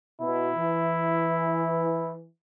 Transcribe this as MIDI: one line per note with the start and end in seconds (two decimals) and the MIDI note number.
0.20 0.50 47
0.20 2.13 64
0.57 2.25 52